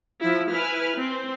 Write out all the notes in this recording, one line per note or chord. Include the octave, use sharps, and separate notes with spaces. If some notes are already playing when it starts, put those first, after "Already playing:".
F3 E4
E4 B4 G#5 F6
C4